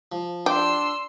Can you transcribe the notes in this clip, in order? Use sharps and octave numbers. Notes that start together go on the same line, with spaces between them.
F3
D4 G4 C6 E6